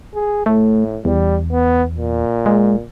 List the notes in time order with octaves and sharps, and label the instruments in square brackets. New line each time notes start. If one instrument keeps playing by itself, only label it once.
[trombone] G#4
[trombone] A2 [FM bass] A3
[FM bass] E2 [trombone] G3
[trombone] B3
A#2
[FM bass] G#3